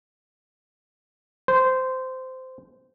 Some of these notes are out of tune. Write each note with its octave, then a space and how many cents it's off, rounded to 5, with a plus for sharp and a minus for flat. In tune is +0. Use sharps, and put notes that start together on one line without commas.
C5 -15